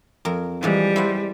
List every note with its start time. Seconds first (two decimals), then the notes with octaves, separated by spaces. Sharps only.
0.25 F2 A#4
0.63 E3 F3 G3 G#3
0.96 E4 C5 F#5